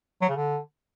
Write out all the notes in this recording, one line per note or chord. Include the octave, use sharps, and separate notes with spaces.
F#3
C#3
D3